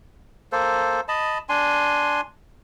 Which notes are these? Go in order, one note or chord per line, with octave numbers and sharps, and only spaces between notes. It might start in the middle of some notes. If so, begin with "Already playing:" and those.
A#3 A4 C5
D#5 A5 B5
D4 G#5 C6